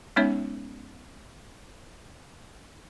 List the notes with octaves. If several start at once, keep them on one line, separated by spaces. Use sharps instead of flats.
G#3 B3 C#4 D#4 C#5 E5